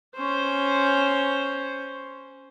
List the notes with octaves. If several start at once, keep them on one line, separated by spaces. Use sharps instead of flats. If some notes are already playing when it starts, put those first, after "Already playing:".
C#4 C5